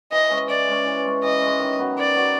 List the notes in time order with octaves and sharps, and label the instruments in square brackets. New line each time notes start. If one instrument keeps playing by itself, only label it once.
[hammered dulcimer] E3 [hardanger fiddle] D#5
[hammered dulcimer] G#3 C#4
[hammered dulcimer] E3 [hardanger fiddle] D5
[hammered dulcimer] G#3 C#4
E3
G#3 C#4
[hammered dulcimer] E3 [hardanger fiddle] D#5
[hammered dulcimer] G#3 C#4
D#3
F#3 B3
[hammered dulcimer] D#3 [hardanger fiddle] D5
[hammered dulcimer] F#3 B3